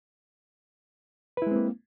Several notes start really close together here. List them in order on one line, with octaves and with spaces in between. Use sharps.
B4 E4 G#3 C4 A#3